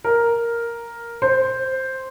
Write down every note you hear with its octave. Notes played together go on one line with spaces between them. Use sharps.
A#4
C5